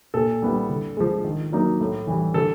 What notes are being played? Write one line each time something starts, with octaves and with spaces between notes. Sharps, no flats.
A#2 A4
G3 B3 E4
D3
F3 G#3
D#3
F#3 A#3 D#4
A2
E3 G3
D3 A4